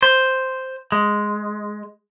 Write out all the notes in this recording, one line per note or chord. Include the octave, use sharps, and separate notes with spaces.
C5
G#3